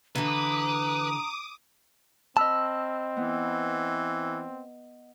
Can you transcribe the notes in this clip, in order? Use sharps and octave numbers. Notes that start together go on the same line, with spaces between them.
D3 E3 B4 A#5 D6 D#6
C4 D#5 A5 B5 E6 F6
E3 B3